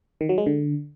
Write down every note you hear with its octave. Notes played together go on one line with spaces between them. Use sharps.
D#3
F#3
G#3
D3